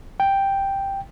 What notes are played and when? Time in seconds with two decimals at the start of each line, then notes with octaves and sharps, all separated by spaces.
0.20 G5